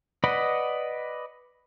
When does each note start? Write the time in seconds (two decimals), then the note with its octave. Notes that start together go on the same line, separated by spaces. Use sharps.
0.24 B4 D5 D#5 F#5 B5